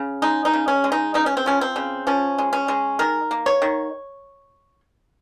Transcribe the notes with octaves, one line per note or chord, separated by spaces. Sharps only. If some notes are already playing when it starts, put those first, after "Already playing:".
Already playing: C#3
G#3 D#4
D#4
C#3
C#4
G#3
D#4
C#3 D#4
C#4
C4
F3 C#4
C4
C#3
F3 C#4
G#3
C#4
G#3
D#3 A#4
A#3
C#5
D#3